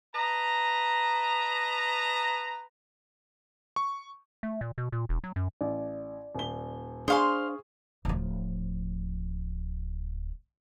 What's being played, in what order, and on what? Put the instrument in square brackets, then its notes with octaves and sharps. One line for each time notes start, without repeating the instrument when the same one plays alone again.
[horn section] B4 D#5 A5 A#5
[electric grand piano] C#6
[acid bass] A3
A#2
B2
A#2
E1
F#3
F#2
[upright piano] A1 [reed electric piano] D5
[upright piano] D#1 G7
[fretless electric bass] D4 [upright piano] G#4 G#5 [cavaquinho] C5 F5 C6 [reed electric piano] C#6 D#6
[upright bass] D1 F3